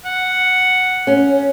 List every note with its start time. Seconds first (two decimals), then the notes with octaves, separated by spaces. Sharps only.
0.05 F#5
1.07 C#4